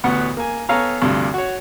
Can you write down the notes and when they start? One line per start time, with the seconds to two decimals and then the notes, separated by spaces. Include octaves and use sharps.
0.04 A1 D2 B3 F#5
0.37 A#3 G#5
0.69 B3 A4 C#5 F5 G#5 A#5
1.01 D2 G2 C3 F3
1.34 F#4 C#5